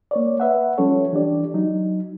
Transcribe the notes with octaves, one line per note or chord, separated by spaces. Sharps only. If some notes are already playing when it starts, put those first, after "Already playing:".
A#3 C#5 D5
B4 E5 F#5
F3 G3 C#4 A4 C#5
E3 D4 G4 D5
F#3 D#4